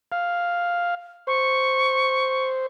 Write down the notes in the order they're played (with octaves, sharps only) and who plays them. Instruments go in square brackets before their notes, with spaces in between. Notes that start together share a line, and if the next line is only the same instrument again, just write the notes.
[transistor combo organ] F5
[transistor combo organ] C5 [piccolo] C#6